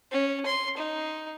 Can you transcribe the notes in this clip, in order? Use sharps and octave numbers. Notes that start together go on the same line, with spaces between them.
C#4
C6
D#4